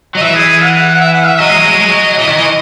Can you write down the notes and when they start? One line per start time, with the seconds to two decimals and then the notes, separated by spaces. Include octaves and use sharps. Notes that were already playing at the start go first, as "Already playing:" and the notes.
0.15 F#3 D#5
0.22 E3 E5
0.35 G#4
0.48 G#4
0.62 F#5
0.94 F#5
1.00 E5
1.14 F#5
1.27 E5
1.40 F#3 D#5
1.48 G#3
1.57 F#3
1.65 G#3
1.73 F#3
1.81 G#3
1.90 F#3
2.19 E3
2.29 D#3
2.39 E3